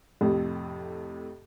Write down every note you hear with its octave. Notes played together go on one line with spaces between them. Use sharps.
F2 A2 C3